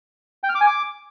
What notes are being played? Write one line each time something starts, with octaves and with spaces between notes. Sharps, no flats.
G5
F6
D6
G#5
D6